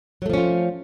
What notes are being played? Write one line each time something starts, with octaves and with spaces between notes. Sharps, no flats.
F3 F#3 A3 C#4 F4